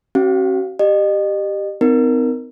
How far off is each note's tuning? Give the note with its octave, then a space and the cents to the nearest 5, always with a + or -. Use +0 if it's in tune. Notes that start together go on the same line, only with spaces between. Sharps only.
C#4 -45 F#4 +40 F5 +0
G4 +0 D#5 -35
C4 -45 D#4 +0 A#4 +0